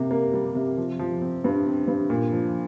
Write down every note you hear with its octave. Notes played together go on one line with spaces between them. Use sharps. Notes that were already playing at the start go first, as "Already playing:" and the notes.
Already playing: C3 G3 A#3
A#3
G3
C3
F3
F3
C4
G2
C4
G2
A#2
F3